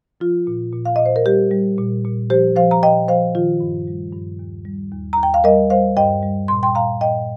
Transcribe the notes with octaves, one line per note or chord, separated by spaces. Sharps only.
F3 F4
A#2
A#2
F5
A#2 D#5
C5
A#4
G3 G4
G3
A#2
A#2
F3 G4 C5
F3 C5 F5
A#5
A#2 D#5 G5
F3 C5 F5
D#3 F4
G2
G3
G2
D#2
G3
D#2
D#2 A#5
G5
F5
G3 A#4 D#5
G3 C5 F5
G2 D#5 G5
G3
A#2 C6
G5 C6
A#2 F5 A#5
A#2 D#5 G5